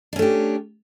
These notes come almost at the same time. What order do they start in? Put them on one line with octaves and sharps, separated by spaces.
D4 C#4 A3 G4